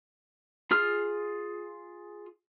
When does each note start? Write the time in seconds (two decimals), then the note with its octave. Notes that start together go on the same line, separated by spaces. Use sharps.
0.71 F4 G#4 F6